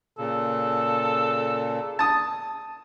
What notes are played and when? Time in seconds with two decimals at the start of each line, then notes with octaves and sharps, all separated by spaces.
0.18 A#2 C#3 A4
1.99 A5 D#6